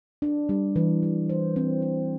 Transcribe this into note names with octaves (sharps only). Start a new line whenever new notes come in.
D4
G3
E3
G3
C5
C4
C5